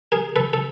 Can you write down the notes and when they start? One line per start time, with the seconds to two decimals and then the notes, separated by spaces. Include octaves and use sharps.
0.12 G#4 A#4
0.36 A4 B4
0.53 A4